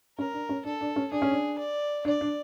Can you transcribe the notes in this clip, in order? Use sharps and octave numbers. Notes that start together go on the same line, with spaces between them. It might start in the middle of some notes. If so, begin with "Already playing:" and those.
C#4 A#4
D4
C#4
D4 A4
D4
C#4
D4 G#4
C#4
D4
D5
D4 D5
D4